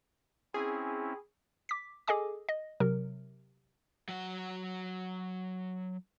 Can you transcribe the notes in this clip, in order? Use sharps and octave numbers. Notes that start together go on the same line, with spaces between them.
C4 C#4 E4 G#4
D6 B6
G#4 A4 D#5 G#5 D6
D#5
C3 F#3 A#4
F#3 F#5